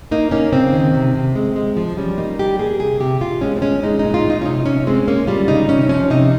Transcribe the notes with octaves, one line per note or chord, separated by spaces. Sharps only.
A#3 D#4
A#3 C#4
C#3 C4
D#3
C3
C3
G#3
G#3
F3
G3 C#4
A#3 D#4
G3 G4
A#3 G#4
C3 G#4
C3 G4
A#2 F4
G#3 C#4
C4
G#3 C#4
G#3 D#4
D#4
A#2
F4
A#2
D#4
C#4
C3 D#4
C3 C#4
G#3 C4
A#3 C#4
G3 F4
C#3 D#4
C3 C#4
F3 C#4
C3 D#4